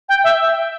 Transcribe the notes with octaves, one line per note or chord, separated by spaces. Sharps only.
G5
E5